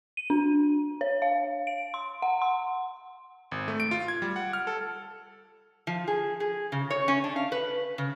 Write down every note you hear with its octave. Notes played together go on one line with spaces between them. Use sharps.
D#7
D4
C#5
F5
D7
C6
F#5
C6
G#1
A3
D7
F4
G#6
G3
F#5
F6
A4
F3
G#4
G#4
C#3
C#5
C#4
D4
F5
B4
C#3